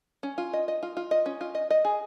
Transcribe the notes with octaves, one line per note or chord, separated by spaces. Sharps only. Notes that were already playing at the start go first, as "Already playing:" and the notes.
C#4
F4
D#5
D#5
F4
F4
D#5
C#4
F4
D#5
D#5
G#4